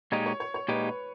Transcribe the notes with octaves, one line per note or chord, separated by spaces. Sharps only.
A#2 G#3 D#4 G4 C#5
C#5
C#5
C#5
A#2 G#3 D#4 G4 B4
B4